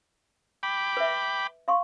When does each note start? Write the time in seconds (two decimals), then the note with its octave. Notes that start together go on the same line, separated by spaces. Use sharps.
0.63 G5 B5 D6
0.97 B4 E5
1.68 F5 C6 C#6